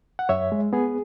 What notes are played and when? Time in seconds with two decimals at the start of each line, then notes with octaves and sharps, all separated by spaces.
0.19 F#5
0.29 F#2 C#5 E5
0.52 G#3
0.73 B3 G#4